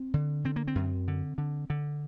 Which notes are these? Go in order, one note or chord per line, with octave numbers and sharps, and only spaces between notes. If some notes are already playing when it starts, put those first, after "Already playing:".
Already playing: C4
D3
D3 C4
A#3
C4
F#2
D3
D3
D3